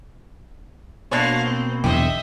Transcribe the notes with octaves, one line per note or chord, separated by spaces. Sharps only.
B2 A#3 D4 F#4 C5 C#5 F5
C4
B1 E2 D3 G4 C5 D#5 E5